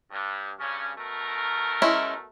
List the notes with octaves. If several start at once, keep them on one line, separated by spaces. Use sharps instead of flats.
G2
G2 C#3 C#4
B2 A3 A#4
G#3 C#4 E4